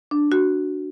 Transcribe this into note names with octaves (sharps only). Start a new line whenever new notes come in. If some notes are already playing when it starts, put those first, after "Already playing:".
D4
F#4